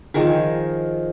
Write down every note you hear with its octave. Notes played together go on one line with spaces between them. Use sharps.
D#3 F3 G#4 A#4